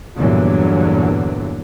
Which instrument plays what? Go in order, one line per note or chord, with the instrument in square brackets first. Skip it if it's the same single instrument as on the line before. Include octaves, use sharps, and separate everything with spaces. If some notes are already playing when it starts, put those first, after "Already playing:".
[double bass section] E2 G2 A#2 D3 E3 F#3